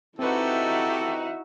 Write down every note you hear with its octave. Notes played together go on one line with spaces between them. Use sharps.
C4 D#4 E4 F#4 G4 A4 B4 E5